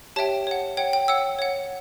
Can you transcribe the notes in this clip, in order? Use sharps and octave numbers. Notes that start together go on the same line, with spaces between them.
G4 C#5 E5 G5 A5
C#5 F#5
C#5 F#5 G5
G5
C#5 F#5 E6
C#5 F#5